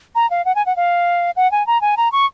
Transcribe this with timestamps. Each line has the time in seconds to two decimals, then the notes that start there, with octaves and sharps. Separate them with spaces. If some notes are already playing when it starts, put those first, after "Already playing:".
0.15 A#5
0.30 F5
0.45 F#5
0.55 G#5
0.66 F#5
0.76 F5
1.36 F#5
1.52 G#5
1.67 A#5
1.81 G#5
1.97 A#5
2.12 C#6